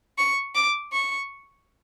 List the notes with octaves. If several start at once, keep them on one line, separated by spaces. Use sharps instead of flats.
C#6
D6
C#6